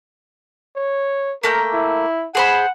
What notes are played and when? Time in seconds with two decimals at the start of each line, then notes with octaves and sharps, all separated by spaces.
0.76 C#5
1.43 A3 A#3 A#4 G5
1.74 E4
2.35 G#4 C5 F#5 B5